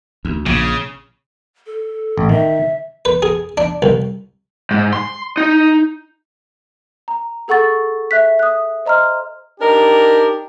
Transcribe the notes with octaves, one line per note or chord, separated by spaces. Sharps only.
D2
A#1 C#3
A4
A1
D#3 E5
B4
G#4
D4
C2
G#2
C6
D#4
A#5
G#4 A4 F#5 C#6 A6
E5 F#6 B6
D#6 F#6
C5 D#5 A#5 C6 F6
D4 D#4 G4 A#4